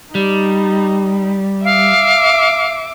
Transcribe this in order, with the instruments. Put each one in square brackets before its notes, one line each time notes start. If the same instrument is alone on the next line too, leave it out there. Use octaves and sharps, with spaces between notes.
[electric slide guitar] G3 [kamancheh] D#4
[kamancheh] E5 D6 [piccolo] F5